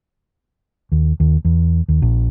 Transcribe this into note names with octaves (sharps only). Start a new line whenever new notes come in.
D#2
D#2
E2
D#2
A#1